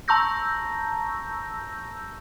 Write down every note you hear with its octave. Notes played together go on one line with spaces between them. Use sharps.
A5 A#5 C#6 E6 G6 A#6